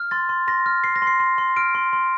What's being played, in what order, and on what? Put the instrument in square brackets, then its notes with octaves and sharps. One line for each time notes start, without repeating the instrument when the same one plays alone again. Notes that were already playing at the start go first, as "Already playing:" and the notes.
Already playing: [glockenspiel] F6
C6 A6
C6
C6 A#6
F6
C6 C7
A#6
C6
C7
C6
C6
F6 D7
C6
C6